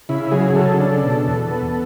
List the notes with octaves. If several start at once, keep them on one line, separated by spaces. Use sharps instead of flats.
C#3 E4
F#3 G#4
C#3 A4
D4
B2
E2
B3